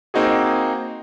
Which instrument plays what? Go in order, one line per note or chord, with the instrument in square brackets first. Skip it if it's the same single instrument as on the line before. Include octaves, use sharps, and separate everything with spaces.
[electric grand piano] A#3 C4 D#4 F#4 G#4